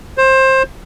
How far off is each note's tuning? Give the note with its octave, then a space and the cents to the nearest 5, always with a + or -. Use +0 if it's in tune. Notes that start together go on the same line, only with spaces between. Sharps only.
C5 +20